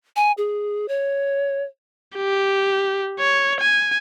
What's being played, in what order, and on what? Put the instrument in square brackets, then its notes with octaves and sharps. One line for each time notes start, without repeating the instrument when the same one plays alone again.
[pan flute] G#5
G#4
C#5
[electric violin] G4
C#5
G#5